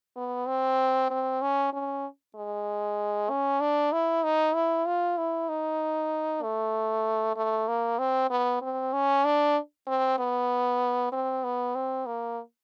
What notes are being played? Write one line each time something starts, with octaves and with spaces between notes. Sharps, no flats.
B3
C4
C4
C#4
C#4
G#3
C#4
D4
E4
D#4
E4
F4
E4
D#4
A3
A3
A#3
C4
B3
C4
C#4
D4
C4
B3
C4
B3
C4
A#3